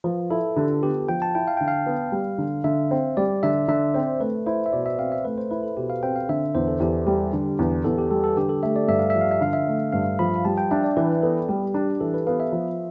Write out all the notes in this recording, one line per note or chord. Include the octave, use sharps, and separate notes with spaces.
F3 B4
E4 A4
D3 G4
F4
B3 G4
F3 G5
A5
E4 G5
F5
D3 G5
F5
B3
G3
D3
D3 E5
C4
G3 D5
D3 E5
D3 E5
C4 C5
A3 B4
E4 C5
E5
B2 D5
E5
C4 F5
E5
A3 B4
C5
E4 B4
A4
B2 G4
F5
C4 G5
F5
D3 E5
E2 C5
A4
E2 G4
G3 G4
D3
E2
E2 A4
G4
G3 A4
A4
D3 G4
A4
A3 E5
D5
G2 E5
F5
F3 E5
F5
E5
D3 F5
E5
A3
G2 F5
F3 B5
B5
G3 A5
G5
D4 E5
D5
E3 B4
B3 A4
G3 G4
D4 G4
E3 A4
B4
B3 F5
E5
F3